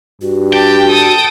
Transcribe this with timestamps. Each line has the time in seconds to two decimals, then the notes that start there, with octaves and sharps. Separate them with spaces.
0.22 G2 F#4
0.53 G4 G5 A5
0.90 A4 D#6